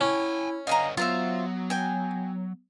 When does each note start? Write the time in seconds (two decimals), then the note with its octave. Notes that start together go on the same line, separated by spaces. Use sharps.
0.01 C#4 E4 G5 G#5
0.67 D3 B3 D#5 F5 G#5 A#5
0.97 F#3 B3 F4 C5 E5
1.70 G5 G#5